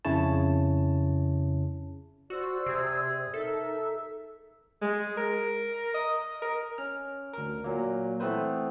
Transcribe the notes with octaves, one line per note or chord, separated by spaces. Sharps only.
F2 C#3 C#4 E4 C#5 A5
F#4 C5 D5 E6
C3 G#4
D#4 A4 A#4 E5
G#3
A#4
D#5
A#4
C#4 F6
D2 A#4
A#2 F#3 A#3
E3 A3 B3 C4 B4 C5